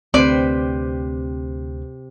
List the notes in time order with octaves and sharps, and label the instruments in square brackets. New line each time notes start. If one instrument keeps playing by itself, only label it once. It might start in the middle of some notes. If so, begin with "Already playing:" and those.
[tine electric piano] D2 [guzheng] C3 B4 C5 [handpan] C4 [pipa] D5